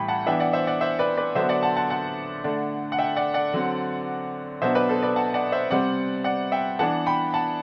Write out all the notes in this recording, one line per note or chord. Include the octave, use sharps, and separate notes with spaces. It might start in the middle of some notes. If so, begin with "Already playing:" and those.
Already playing: A2 E3 G3 G5 B5
F#5 A5
E3 B3 D4 E5 G5
D5 F#5
C5 E5
D5 F#5
C5 E5
B4 D5
B4 D5
D3 F#3 B3 D4 C5 E5
D5 F#5
F#5 A5
F#5 A5
F#5 A5
D3 A3 D4
F#5
E5 G5
D5 F#5
D5 F#5
D3 F#3 C4
B2 F#3 B3 D4 C5 E5
B4 D5
A4 C5
B4 D5
F#5 A5
D5 F#5
C5 E5
C3 G3 C4 D5 F#5
D5 F#5
E5 G5
E3 B3 D4 F#5 A5
G5 B5
F#5 A5